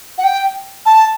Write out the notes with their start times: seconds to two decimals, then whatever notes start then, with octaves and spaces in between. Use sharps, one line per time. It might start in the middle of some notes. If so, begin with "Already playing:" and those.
0.18 F#5
0.24 G5
0.86 A5